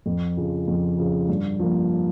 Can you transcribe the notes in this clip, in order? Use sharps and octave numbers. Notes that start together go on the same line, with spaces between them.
F2
C#3 F3
F2
C#3 F3
G2
F3 A#3